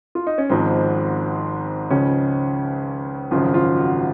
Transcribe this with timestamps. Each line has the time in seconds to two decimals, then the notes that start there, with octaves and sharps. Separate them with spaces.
0.15 F4
0.27 D#4
0.38 C#4
0.49 G#1 G#2 F3 C4
1.90 C#2 C#3 F3 C#4
3.31 G#1 F#2 C#3 F3 F4
3.54 F4
3.78 F#4